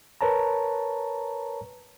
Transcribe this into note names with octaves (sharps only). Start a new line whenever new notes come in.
A#4 B4 C#5 A5 A#5